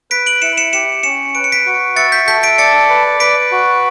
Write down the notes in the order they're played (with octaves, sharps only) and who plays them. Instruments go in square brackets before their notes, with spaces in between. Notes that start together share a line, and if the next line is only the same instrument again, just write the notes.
[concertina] B4 [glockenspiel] B6 D7
[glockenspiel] D7 F#7
[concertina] E4 [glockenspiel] C#7 E7
[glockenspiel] C#7 E7
[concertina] G4 [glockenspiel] C#7 E7
[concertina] C#4 [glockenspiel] C#7 E7
[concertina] B4 [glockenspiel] D7
[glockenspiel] C#7
B6 D7
[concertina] F#4
[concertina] E5 [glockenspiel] A6 C#7
[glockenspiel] G6 B6
[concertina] A4 [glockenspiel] G6 B6
[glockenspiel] B6 D7
[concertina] D5 [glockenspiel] A6 C#7
[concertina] B4
[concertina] B4 [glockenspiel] B6 D7
[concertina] F#4